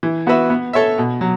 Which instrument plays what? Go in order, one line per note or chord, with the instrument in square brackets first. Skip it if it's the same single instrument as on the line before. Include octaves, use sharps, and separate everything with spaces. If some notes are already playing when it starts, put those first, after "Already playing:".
[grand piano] E3
B3 F#4 B4 E5
B3
A4 C#5 E5
B2
F#3